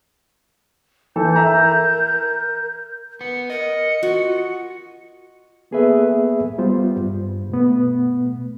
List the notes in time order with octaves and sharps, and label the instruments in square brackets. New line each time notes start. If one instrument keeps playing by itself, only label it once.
[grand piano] E3 A4 [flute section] A#4 G6
[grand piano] E5 A#5
[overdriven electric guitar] B3 [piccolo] C#7
[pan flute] A#4 [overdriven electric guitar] D#5 [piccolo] C#7
[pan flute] F4 [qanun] F#4
[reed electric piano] A#3 B3 G#4 A4 B4 E5
G3 B3 F4 C5
G2
B2 A3 B3